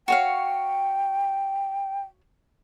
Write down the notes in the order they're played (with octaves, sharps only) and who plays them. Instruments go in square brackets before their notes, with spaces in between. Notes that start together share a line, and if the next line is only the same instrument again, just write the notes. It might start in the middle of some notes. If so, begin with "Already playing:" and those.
[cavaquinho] F#4 C#5 F5 [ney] G5